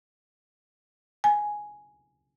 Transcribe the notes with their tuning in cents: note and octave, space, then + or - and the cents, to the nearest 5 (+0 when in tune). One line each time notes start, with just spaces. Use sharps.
G#5 +5